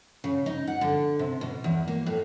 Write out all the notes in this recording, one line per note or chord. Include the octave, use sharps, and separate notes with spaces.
C#3
D#4
F#5
D3
C3
B2
E2
A#3
A2